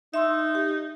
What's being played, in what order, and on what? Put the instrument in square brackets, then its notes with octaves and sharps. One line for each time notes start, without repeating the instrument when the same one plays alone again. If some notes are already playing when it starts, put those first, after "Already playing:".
[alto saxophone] D#4 [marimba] E5 C6 E6
[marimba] G4